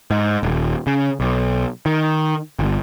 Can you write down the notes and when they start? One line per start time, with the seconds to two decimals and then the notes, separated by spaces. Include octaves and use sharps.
0.11 G#2
0.43 D#1
0.87 C#3
1.20 B1
1.86 D#3
2.59 G1